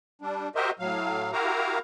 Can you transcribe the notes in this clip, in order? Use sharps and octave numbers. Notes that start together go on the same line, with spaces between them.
G3 D4
F#4 G4 A#4 C5 D#5 E5
A2 F#3 F5
E4 F#4 G4 A#4 F5 A#5